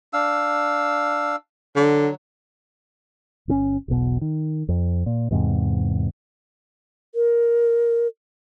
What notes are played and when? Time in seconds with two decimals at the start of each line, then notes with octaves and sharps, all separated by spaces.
0.13 D4 F5 E6
1.76 D3 F#3
3.48 G1 D3 C#4
3.88 E1 B1 B2
4.21 D#3
4.69 F2
5.06 A#2
5.31 E2 G#2 C3
7.15 A#4